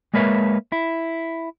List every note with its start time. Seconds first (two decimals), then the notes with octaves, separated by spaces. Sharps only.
0.14 G#3 A#3 A#4 B4 C#5 E5
0.72 E4